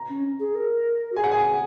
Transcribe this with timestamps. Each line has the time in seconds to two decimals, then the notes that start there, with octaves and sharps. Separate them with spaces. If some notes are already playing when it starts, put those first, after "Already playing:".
Already playing: A#5
0.09 C#4
0.39 G#4
0.55 A#4
1.12 F#4
1.16 G#4 G#5
1.24 F#5
1.32 G#5